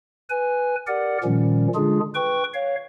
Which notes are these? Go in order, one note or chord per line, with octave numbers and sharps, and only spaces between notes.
B4 G#5
G4 A#4 D5 F#5
A#2 D#3 F3 G3 C#4
D3 G#3 D4 F4 G#4
B4 G5 C#6
C#5 F5